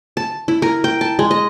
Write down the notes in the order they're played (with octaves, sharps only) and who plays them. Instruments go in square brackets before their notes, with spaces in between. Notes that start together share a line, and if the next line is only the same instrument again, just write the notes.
[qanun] A5
E4
A#4
G5
A5
G#3
D#5